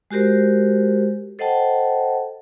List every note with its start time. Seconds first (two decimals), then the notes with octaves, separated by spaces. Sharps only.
0.11 G#3 F#4 G4 A#4 C5
1.39 A4 C5 D#5 F#5 G5 A5